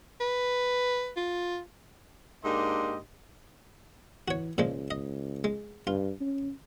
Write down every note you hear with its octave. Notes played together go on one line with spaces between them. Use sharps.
B4
F4
G#2 A#3 D4 G4 D#5 C6
E3 F#4 C#5
C#2 A#2 F3 G#3
D#5
G#3
G2 F4
C#4